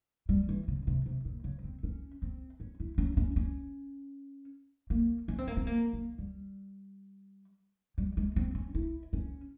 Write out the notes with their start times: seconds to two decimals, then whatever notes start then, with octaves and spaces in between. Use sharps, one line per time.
0.29 G3
0.49 E3
0.68 C#3
0.87 C3
1.06 C3
1.25 A#2
1.44 C#3
1.64 C4
1.83 C#4
2.22 C4
2.60 C#4
2.80 E4
2.98 C#4
3.17 C#4
3.36 C#4
4.90 A#3
5.28 C#4
5.39 C4
5.47 A#3
5.57 C4
5.67 A#3
5.93 A#3
6.18 G3
7.98 G3
8.17 G#3
8.36 C4
8.55 C#4
8.75 E4
9.13 C#4